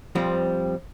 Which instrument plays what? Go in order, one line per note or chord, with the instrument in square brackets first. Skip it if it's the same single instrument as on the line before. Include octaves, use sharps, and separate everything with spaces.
[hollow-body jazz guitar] F2 F3 G3 C4